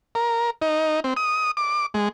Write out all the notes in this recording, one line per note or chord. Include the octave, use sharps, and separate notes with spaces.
A#4
D#4
C4
D#6
D6
G#3